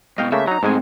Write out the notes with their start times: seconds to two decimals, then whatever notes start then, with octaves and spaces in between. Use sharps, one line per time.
0.18 G#2 B2 D#5 F5 G5
0.32 C#3 A3 A#3 E5
0.48 F#3 D#4 A#5
0.63 G#2 G#3 A3 C4 G#5